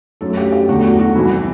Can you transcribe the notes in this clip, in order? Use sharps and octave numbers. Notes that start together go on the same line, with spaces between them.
F#2 F#3 A3 A4
G4
G4
E2 D3 A3 F#4
F#4
F#4
C2 C3 E3 E4